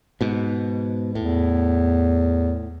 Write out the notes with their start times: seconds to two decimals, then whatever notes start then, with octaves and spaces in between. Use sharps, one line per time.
0.21 G#2 B2
1.15 E2 A2